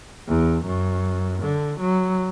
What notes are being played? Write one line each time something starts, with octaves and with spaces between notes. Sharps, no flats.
E2
F#2
D3
F#3